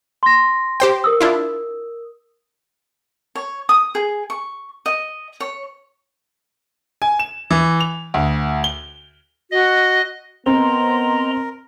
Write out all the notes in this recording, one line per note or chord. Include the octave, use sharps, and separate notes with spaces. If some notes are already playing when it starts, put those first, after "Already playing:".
C6 A#6
G4 C5 G5
A#4 D#6 E6
D4 E4 F4
C#5
D#6
G#4
C#6
D#5
C#5
G#5
E7
E3
F7
D2
G7
F#4 D#5
B3 C4 A#4 D#5 A#5 C6